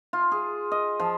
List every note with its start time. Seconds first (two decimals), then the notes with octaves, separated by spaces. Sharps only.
0.13 F4
0.32 G#4
0.72 D#5
1.00 F3